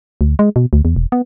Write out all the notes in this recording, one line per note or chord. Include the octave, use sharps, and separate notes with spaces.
D2
G#3
B2
D2
E2
E1
B3